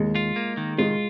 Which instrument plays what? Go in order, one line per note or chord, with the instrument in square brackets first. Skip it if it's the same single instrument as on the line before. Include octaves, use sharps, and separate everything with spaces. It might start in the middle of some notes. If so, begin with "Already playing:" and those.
Already playing: [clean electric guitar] D#2 [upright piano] G#3
[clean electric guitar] F4
A#3
D#3
[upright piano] G#3 [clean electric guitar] F4